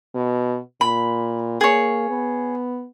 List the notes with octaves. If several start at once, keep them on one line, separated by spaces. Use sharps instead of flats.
B2
A#2 B5
A#3 G#4 C#5
B3